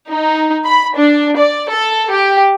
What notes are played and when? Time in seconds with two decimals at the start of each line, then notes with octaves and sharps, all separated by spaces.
0.10 D#4
0.65 B5
0.95 D4
1.37 D5
1.70 A4
2.12 G4